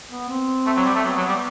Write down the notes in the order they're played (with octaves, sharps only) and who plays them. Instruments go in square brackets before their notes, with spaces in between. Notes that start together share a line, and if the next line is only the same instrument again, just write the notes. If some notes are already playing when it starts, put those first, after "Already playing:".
[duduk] B3
C4
[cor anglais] A3
F#3
G3
A3
[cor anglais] F#3 [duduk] B3
[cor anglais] F#3
G3